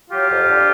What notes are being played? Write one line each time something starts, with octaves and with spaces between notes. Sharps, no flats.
F#3 F4 G4
F2
D3